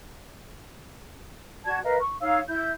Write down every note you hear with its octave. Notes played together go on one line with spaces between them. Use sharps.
F#4 D5 A5 G#6
A#4 B4 D#5 F5
C#6
D#4 C#5 F5 E6
E4 G6